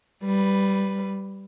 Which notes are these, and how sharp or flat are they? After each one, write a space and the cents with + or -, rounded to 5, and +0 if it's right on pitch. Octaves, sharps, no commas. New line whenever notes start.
G3 -5 B4 +0